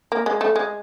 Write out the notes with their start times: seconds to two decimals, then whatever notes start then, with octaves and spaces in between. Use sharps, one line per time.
0.12 A#3
0.26 G#3
0.41 A3
0.56 G#3